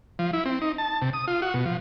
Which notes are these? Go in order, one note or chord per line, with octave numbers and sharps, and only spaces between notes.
F3
E4
C4
D#4
A5
C3
D#6
F4
F#4
B2
F3